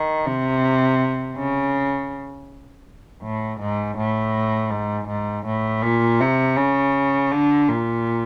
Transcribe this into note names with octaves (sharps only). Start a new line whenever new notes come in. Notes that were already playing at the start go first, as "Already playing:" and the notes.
Already playing: D#3
C3
C#3
A2
G#2
A2
G#2
G#2
A2
A#2
C3
C#3
D3
A#2